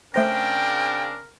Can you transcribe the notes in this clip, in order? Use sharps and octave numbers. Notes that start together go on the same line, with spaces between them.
C#3 A3 C4 D4 A#4 C5 G5 A#6